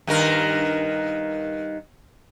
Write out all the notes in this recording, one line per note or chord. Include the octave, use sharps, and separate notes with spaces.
G2 D#3 A#4